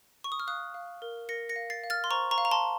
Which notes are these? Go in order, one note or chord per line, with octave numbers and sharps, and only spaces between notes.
C#6
D#6
F6
F5 D#6 F#6
F5
A#4
A#4 A#6 C#7
A#6 C#7
F5
A6 C7
F5
F6 A6
C6
C5 A#5 C#6
A#5 C#6
F5
A#5
A5 C6